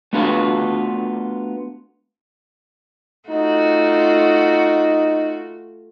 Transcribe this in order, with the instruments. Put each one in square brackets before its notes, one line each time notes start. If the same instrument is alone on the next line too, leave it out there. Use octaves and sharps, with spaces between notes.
[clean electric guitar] A3 B3 D4 F4 F#4 B4
[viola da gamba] A3 F4 F#4 [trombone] D#4